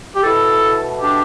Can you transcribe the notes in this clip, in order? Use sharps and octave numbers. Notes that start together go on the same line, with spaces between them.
G4
B2 A3 E4 A4
D4 G4